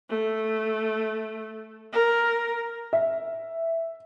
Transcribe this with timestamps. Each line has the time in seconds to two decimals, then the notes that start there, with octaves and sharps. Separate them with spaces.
0.10 A3
1.93 A#4
2.93 E5